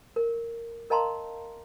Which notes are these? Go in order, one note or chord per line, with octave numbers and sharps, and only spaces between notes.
A#4
A#4 D#5 F5 A5 A#5 C6